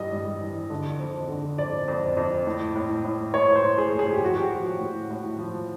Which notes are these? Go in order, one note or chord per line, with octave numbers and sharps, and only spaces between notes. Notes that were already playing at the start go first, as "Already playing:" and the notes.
Already playing: G2 E3 G3 D#5
G3
E3
D3
F2
D3
F2 D5
F2
F2
A2
A2
A2
A2 C#5
C5
A2
G#4
A2
G#4
G4
F3 F#4
G4
F3
A2
A2
F3